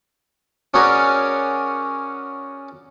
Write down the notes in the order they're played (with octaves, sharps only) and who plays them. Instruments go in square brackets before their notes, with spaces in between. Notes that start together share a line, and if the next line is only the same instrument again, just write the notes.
[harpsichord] C#4 F#4 G#4 A#4 C#5 D5